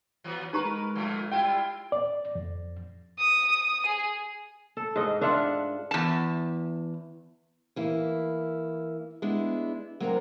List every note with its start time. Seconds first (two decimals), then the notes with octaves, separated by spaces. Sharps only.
0.24 E3 F#3 B3
0.53 G#3 D#4 G4 A#4 B4 A#5
0.95 A#2 F3 A3
1.32 G3 E4 F4 G5
1.92 D5
2.35 F2
3.19 D#6
3.87 G#4
4.77 A4
4.96 G#2 D#5
5.21 D4 F4 E5 F#5
5.91 E2 A5
7.76 E3 A#3 E4
9.22 G#3 B3 D4 E4
10.00 F#3 A#3 C4 D4 A#4 A#5